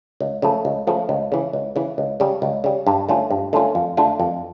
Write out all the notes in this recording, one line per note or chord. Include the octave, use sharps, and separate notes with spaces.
C#2
C#3 F3 A3
C#2
C#3 F3 A3
C#2
C#3 E3
C#2
C#3 E3
C#2
C#3 G3
C#2
C#3 G3
G2
D3 A3 C#4 F4
G2
D3 A3 C#4 F4
F2
D3 A3 D4 F4
F2